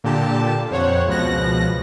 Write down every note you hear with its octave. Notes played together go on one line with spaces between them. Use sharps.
A#2 D3 G4 A5
F2 C5 C#5 F#5
C#2 B2 F3 F#6 A#6